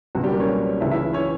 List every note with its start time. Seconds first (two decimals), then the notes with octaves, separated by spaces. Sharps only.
0.15 C#2 F#3 F#4
0.18 B2
0.23 G3 G4
0.32 A#3 A#4
0.40 C#4 C#5
0.81 C#2 C#3 E3 E4 E5
0.91 E4 E5
1.13 C#4 C#5